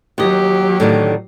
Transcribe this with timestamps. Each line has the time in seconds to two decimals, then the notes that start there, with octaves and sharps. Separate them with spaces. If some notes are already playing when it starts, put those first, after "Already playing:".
0.18 D#2 F#3 G4 D#5
0.80 A2 D3 D#3